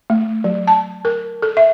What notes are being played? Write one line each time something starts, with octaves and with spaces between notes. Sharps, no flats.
A3
F#3
A5
A#4
A4
E5